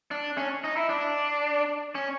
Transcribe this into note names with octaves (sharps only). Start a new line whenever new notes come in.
D4
C#4
D#4
E4
D4
C#4